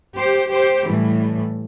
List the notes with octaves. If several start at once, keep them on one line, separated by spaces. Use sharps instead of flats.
G4 C5
G4 C5
A2 E3 G3